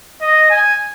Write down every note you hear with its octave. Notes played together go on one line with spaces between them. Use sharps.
D#5
G#5